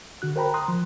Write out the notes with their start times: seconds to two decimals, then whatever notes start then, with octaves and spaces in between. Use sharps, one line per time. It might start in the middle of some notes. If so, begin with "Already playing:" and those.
0.22 D3 F#4 F#6
0.36 A#4 C5 G5 A#5 B5
0.54 A#5 C6 D#6 F#6
0.68 F3